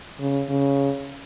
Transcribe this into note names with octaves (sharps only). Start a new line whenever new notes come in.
C#3
C#3